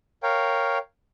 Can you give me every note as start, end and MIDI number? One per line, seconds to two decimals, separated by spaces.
0.23 0.78 70
0.23 0.78 73
0.23 0.78 77
0.23 0.78 79